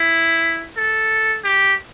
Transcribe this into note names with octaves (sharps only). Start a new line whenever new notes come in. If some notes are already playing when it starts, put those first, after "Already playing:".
Already playing: E4
A4
G4